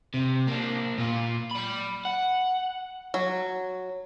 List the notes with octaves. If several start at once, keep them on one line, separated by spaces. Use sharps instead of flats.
C3
A#3 D4
A#2 F4
D5 B5
F#5
F#3